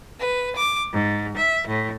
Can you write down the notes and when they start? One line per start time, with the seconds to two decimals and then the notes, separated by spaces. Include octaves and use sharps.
0.19 B4
0.56 D6
0.93 G#2
1.37 E5
1.67 A2